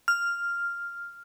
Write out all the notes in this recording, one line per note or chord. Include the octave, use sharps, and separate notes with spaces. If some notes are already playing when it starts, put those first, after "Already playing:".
F6